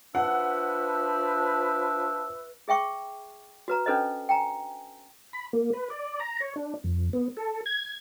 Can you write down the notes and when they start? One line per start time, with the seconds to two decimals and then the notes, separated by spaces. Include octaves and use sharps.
0.15 F3 D4 B4 E5 F#5
2.68 G#4 E5 G5 C#6 D6
3.68 F#4 B4 A#5
3.86 C#4 D4 A4 B4 C5 D#5
4.29 G5 G#5 A#5
5.33 B5
5.53 A#3
5.73 B4
5.90 D5
6.20 A#5
6.40 C#5
6.56 D4
6.84 F2
7.13 B3
7.37 A4
7.66 G#6